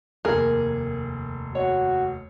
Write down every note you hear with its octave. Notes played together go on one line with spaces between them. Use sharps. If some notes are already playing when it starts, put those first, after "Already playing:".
F1 D#2 G#4 A#4
F#4 C#5